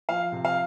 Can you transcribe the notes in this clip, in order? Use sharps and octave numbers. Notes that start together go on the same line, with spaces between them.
F3 F5
C3
F5